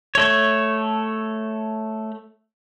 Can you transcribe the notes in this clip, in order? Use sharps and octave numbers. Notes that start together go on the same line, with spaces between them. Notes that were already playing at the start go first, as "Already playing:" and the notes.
A3 C#5